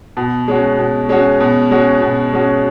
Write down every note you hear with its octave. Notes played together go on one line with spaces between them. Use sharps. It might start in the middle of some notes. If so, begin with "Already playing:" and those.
B2
G#3 C#4 F#4
B2
G#3 C#4 F#4
B2
G#3 C#4 F#4
B2
G#3 C#4 F#4